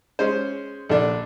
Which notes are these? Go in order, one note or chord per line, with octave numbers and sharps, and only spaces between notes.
G#3 C#4 C5
A#1 D3 D4